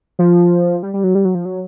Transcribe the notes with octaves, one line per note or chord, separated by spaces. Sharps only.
F3
G3
G3
F#3
G3
F#3
F3
F#3